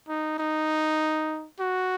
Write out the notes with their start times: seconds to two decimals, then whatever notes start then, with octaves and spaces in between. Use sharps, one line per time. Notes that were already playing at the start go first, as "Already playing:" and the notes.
0.08 D#4
0.39 D#4
1.60 F#4